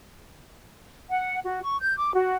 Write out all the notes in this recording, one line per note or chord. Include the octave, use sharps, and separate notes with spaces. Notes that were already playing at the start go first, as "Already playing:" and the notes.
F#5
F#4
C#6
G6
D6
F#4